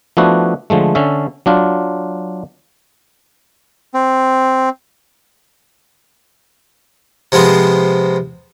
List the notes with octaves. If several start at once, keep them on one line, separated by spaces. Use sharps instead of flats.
F3 A3 B3 D4 E4 F#4
D3 F3 G#3 A3
D3 C#4 A4 E5
F#3 D4 F4
C4
C3 F3 G#3 B3 C4